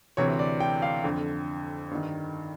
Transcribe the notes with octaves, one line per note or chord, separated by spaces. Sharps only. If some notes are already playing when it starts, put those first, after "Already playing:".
D2 C3 E3 C#5
D5
G5
F5
F2 D3
G2 D#3